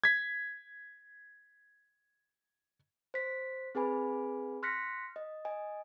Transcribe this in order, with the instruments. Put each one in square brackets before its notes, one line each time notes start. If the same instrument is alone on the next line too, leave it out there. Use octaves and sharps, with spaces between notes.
[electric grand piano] G#6 B6
[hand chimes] C5 B6
C4 G#4 B4 G#5 B5
C6 F6 F#6 A#6 B6 C#7
D#5
D#5 G#5